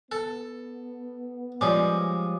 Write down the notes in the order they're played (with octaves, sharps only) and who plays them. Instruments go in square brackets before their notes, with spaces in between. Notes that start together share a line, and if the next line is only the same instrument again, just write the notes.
[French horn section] B3 [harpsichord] A4
[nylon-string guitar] F3 G3 G#3 [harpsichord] C#4 [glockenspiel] D6 D#6